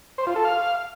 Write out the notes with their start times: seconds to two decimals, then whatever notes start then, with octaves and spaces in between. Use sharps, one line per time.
0.18 C5
0.27 F4
0.36 A4
0.45 F5